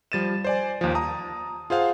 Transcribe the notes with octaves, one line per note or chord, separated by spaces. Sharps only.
F3 G3 A6 D#7 E7
C5 D5 G#5
D#2 F3
A5 A#5 D#6
F4 G#4 C5 F5 F#5